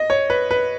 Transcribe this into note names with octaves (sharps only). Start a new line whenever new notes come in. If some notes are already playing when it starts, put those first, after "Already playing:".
Already playing: D#5
C#5
B4
B4